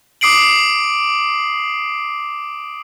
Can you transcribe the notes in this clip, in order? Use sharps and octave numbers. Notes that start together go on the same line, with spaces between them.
D6 D#6 C7 D7 F#7